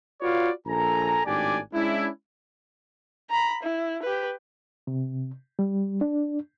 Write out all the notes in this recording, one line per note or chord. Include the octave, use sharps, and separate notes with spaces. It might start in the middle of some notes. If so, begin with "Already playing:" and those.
F4 F#4 B4 C#5 D5 F5
A#1 A4 G#5 A#5
G#1 A2 D4 G4 D5 G#5
G#3 C#4 D4 E4
A#5 B5
E4
G4 B4
C3
G3
D4